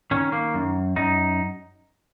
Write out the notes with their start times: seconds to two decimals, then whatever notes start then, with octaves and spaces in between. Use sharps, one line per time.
0.11 D#3 C#4
0.32 A#3
0.54 F#2
0.96 F#2 D#4